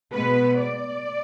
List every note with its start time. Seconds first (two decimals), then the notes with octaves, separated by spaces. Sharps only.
0.12 B2 G#3 B3 B4
0.59 D5